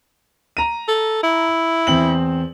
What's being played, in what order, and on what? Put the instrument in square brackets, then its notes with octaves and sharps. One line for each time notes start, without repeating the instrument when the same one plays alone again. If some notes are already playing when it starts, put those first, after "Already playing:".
[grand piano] A#5 D#7
[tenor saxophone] A4
E4
[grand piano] E2 C4 F#7